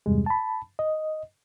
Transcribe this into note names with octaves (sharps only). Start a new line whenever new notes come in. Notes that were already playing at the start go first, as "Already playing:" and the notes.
E2 G2 C3 G3 G#3
A5 B5
D#5